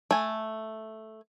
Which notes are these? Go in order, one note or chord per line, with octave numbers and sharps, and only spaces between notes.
A3 G#5